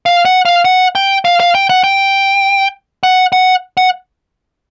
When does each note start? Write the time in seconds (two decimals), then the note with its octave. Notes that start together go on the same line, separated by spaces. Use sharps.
0.06 F5
0.25 F#5
0.45 F5
0.65 F#5
0.95 G5
1.25 F5
1.40 F5
1.55 G5
1.70 F#5
1.84 G5
3.03 F#5
3.32 F#5
3.77 F#5